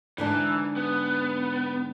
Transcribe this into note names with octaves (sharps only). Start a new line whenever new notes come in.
G#2 D3 E3 D4
B3